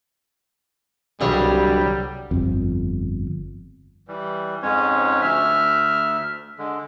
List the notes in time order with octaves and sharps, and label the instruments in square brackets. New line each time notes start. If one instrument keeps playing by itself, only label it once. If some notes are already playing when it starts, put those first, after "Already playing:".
[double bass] C2 [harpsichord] G2 G#4 C#5 [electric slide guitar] D3 F#3 [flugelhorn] G3
[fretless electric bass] G1 F2
[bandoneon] E3 G3
F2 G#2 G#3 C#4 C#5
D2 E5 F6
D3 G#3